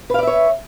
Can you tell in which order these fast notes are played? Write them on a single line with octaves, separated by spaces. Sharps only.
B4 F5 D5 E5 C#5